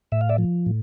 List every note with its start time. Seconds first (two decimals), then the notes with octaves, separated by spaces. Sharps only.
0.12 A2 E5
0.21 F5
0.29 D5 E5
0.38 F3
0.66 A2